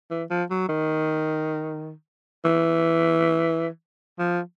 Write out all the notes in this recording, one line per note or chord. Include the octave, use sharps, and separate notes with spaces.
E3
F3
F#3
D#3
E3
F3